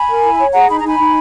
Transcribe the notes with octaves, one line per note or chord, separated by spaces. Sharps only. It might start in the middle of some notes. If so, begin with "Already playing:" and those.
Already playing: G#5 B5
A#4
E4
C#5
G#4 F#5 A#5
D#4 B5
A#5
D#4 G#5 B5
D#4